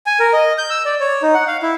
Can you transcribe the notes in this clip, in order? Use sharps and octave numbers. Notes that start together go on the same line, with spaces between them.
G#5
A#4
D#5
G6
E6
D5
C#5
D#4
F#5
F5
E4